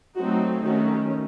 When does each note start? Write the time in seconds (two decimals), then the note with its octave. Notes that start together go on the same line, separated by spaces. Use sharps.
0.17 F#3 A3 C4 D#4 F#4
0.64 D#3 A3 C#4 F#4